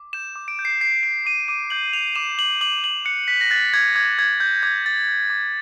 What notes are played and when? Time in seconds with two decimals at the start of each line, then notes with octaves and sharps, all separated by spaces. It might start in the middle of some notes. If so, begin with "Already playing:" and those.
Already playing: D6
0.13 G6 E7
0.36 D6
0.48 D7
0.59 G6
0.65 C7
0.81 G6 C7
1.03 G6 D7
1.25 D6 D#7
1.48 D6 D#7
1.70 G6 F#7
1.93 D6 F7
2.15 D6 E7
2.38 D6 F#7
2.61 D6 F#7
2.83 D6 F#7
3.05 F#6 C#7
3.28 F#6 B6
3.41 A#6
3.50 F#6 A6
3.74 D6 G#6
3.95 D6 G#6
4.18 F#6 G#6
4.40 F#6 G6
4.62 D6 G#6
4.85 G6 A6
5.09 G6
5.30 D6